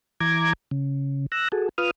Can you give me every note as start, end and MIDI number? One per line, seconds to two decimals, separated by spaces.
0.21 0.53 52
0.21 0.53 82
0.21 0.53 86
0.21 0.53 92
0.71 1.26 49
1.32 1.48 88
1.32 1.48 90
1.32 1.48 94
1.52 1.69 66
1.52 1.69 68
1.52 1.69 69
1.78 1.91 65
1.78 1.91 71
1.78 1.91 87
1.78 1.91 89